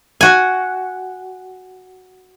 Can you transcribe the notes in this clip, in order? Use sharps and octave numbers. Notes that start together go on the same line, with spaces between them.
F#4 G#5